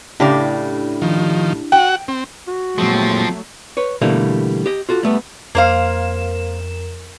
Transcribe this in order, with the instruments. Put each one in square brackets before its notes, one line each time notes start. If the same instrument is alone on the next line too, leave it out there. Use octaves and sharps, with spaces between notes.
[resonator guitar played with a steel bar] A2 C#3 D5 [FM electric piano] D4 E4 G4
[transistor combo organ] D#3 F3
[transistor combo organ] F#4 F#5 [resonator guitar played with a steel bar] G5
[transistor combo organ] C4
[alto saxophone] F#4
[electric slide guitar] A#2 G#3 [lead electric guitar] F3 C4 [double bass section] F#3 A3
[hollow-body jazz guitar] B4 C#5
B2 D3 E3 G3 A3 A#3
G4 D#5
F4 F#4 A4
G3 A3 B3
[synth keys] F2 A#4 E7 [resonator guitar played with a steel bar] A#3 C5 F5